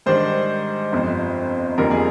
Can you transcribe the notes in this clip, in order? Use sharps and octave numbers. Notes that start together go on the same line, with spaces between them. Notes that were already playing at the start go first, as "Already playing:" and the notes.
G#2 D#3 G3 D4 C5
G1 F2 C3
F1 F2 D3 G3 A#3 A#4
G#4